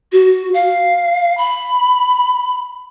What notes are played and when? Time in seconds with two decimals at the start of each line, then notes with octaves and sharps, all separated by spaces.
0.12 F#4
0.54 F5
1.38 B5